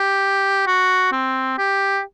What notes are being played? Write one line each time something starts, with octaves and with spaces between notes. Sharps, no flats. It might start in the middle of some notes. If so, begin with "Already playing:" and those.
Already playing: G4
F#4
C4
G4